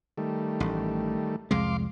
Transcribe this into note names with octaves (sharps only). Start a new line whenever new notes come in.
D#3 G3 A3
A1
C2 F2 G#3 F5 C6 D6